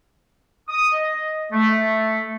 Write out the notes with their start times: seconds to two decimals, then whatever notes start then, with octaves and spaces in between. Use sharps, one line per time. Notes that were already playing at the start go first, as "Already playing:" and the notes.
0.69 D#6
0.94 D#5
1.53 A3